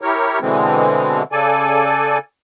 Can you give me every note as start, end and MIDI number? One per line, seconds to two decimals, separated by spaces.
0.02 0.39 64
0.02 0.39 67
0.02 0.39 70
0.02 0.39 73
0.41 1.23 47
0.41 1.23 50
0.41 1.23 52
0.41 1.23 56
0.41 1.23 60
1.32 2.18 49
1.32 2.18 69
1.32 2.18 74
1.32 2.18 80